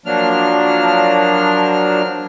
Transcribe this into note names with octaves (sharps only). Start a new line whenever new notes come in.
F3 F#3 A#3 D4 F6